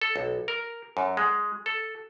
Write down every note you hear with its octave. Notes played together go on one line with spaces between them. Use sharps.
A4
B1
A#4
F#2
G#3
A4